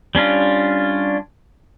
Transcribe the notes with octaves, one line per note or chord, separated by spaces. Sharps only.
G3 C#4 D4 F4